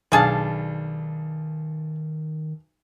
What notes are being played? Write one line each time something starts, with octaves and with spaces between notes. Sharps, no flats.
B1 D#3 G3 D4 G#4 F5 A5